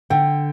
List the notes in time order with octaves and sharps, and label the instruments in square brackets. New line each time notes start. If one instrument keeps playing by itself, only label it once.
[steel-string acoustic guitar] D3 [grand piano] G5